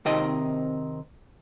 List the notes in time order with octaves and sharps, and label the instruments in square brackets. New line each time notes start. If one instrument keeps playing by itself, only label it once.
[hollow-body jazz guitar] C3 D#3 C4 D#4 D#5